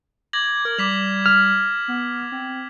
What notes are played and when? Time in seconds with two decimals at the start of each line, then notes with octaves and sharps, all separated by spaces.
0.33 D6 G#6 A#6 F#7
0.65 A#4 F6
0.78 G3 D6 B6 F7
1.26 F6
1.88 B3
2.32 C4